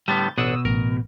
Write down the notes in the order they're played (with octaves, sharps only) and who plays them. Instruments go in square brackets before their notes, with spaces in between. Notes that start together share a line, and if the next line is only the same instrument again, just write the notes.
[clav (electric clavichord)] A2 D3 B3 [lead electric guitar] G3 [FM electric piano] G6 A6
[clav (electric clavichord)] A1 D4 F#5 [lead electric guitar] B2 [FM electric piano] D#6 E6
[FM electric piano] A1 [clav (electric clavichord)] A#4